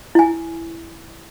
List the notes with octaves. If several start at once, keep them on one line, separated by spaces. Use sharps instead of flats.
E4 G#5